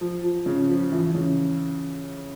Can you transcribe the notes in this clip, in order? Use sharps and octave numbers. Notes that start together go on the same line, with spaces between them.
F3
F3
C#3
F3
E3
C#3